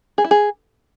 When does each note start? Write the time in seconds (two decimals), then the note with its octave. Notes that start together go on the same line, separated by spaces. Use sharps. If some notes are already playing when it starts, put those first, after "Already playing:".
0.18 G#4
0.24 E4
0.31 G#4